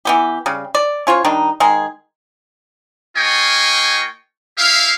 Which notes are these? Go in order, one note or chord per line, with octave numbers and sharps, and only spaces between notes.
E3 B3 G4
C#3 G3
D5
C#4 F4 C5 C#5
D#3 G3 D4 D#4
D#3 G#3 G#4
A#3 F4 D#5 G5 G#5 C#6
E4 G4 E5 F5